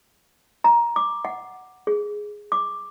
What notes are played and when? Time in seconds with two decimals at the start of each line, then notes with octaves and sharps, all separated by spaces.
0.64 A#5
0.96 D6
1.25 F#5
1.87 G#4
2.52 D6